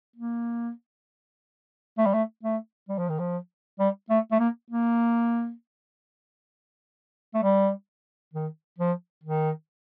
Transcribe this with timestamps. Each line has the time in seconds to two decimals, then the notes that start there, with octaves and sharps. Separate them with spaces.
0.16 A#3
1.98 A3
2.06 G3
2.13 A3
2.43 A3
2.89 G3
2.98 F3
3.09 D#3
3.19 F3
3.80 G3
4.10 A3
4.32 A3
4.40 A#3
4.70 A#3
7.34 A3
7.43 G3
8.34 D#3
8.78 F3
9.23 D#3